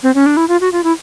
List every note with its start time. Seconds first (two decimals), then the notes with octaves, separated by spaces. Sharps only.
0.03 C4
0.15 C#4
0.26 D4
0.37 E4
0.49 F4
0.61 F#4
0.73 F4
0.84 E4